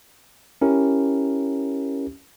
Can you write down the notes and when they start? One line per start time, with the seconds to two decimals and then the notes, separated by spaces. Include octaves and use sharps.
0.62 C#4 E4 G4 A#4